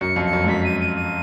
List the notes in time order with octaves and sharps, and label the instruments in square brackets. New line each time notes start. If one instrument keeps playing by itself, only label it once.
[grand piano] F#2 [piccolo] C#7
[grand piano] F2
[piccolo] C#7
[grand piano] F#2
G#2
[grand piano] F#2 [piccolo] B6
[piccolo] D#7
D#7
D#7